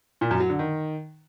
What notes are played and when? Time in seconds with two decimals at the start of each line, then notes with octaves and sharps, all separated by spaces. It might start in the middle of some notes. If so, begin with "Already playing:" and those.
0.21 A#2
0.31 F#2
0.40 F#3
0.50 D3
0.59 D#3